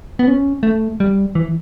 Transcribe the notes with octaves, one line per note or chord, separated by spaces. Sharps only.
B3
C#4
A3
G3
E3